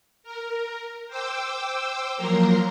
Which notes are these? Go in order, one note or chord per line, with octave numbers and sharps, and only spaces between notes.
A#4
C5 G5 D6 E6
F3 F#3 A#3 A#4 A#5 C6